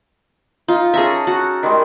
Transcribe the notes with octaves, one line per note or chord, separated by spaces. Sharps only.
D#4 F4
C#4 G#4 A4 E5 A#5
F#4
D#3 G3 G#3